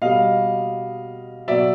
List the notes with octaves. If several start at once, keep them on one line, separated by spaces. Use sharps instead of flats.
B2 G3 D#5 F5
B2 F#3 D5 E5